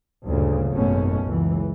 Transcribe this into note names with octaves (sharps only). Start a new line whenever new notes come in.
D2 G2 A#2 C#3
G#1 F#2 B2 A3 C#4
F#1 C#2 E3